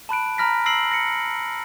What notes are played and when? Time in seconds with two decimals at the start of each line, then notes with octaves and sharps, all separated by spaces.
0.09 A5 B5 F#6 D7
0.38 A#5 B5 F6 A#6 B6
0.66 E6 A#6 C7 D7 F#7
0.91 A#6 C#7